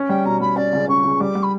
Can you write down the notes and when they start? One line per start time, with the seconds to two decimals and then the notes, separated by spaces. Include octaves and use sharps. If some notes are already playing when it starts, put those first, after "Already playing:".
Already playing: C#4
0.09 G3 G5
0.25 B2 A#5
0.41 G3 B5
0.56 C#4 D5
0.73 C#2
0.88 C#4 C#6
1.04 C#2
1.20 G3 D6
1.35 G3
1.43 B5